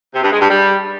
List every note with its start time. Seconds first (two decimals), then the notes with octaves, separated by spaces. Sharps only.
0.14 C3
0.23 G2
0.31 G#3
0.40 G2
0.49 G3